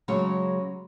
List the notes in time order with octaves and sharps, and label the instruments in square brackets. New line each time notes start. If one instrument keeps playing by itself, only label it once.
[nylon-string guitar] C#3 F#3 G#3 G#4 C#5